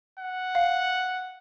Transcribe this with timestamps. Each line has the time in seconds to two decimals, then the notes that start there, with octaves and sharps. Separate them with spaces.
0.19 F#5
0.55 F5